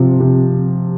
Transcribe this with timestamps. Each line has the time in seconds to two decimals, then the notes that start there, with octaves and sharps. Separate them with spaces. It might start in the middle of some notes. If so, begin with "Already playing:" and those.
Already playing: C3 F3
0.20 C3